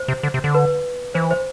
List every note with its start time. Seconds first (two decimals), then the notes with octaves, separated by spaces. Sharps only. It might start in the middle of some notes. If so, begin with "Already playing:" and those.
Already playing: C5
0.08 C3
0.23 D3
0.34 C3
0.44 D3
0.54 B4
1.14 E3 C5
1.31 C5